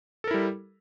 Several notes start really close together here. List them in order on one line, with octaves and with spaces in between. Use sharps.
A4 A#4 E4 G3